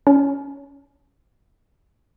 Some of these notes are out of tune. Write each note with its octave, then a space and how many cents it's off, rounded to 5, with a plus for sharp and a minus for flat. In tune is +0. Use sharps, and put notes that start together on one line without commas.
C#4 +15